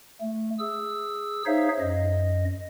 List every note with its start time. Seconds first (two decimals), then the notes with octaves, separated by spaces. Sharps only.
0.21 A3
0.59 G#4 E6
1.46 D#4 G#4 C5 C#5 E5 F5
1.79 F#2 D#5